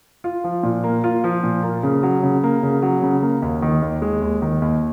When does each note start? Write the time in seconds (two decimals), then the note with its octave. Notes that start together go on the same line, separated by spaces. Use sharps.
0.24 F4
0.44 F3
0.63 A#2
0.84 A#3
1.04 F4
1.24 F3
1.43 A#2
1.63 A#3
1.83 C#3
2.03 F#3
2.23 C#3
2.43 A#3
2.63 C#3
2.82 F#3
3.03 C#3
3.23 A#3
3.42 D#2
3.62 D#3
3.82 D#2
4.02 G#3
4.22 D#2
4.42 D#3
4.62 D#2